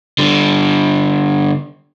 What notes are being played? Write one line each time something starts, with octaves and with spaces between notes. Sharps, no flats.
D3 G3